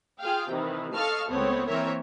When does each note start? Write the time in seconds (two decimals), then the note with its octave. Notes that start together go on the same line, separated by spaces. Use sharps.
0.20 F4 G#4 F5 G5
0.49 C3 D#3 E3
0.94 A4 D#5 F5 A5 C#6 F6
1.27 C#2 A3 B3 C4 C#5
1.68 E3 A#3 C4 A#4 C#5 E5